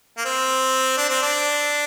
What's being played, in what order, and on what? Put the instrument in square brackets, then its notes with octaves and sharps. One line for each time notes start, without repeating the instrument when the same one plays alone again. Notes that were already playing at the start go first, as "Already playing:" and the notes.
[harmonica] A#3
C4
D4
C4
D4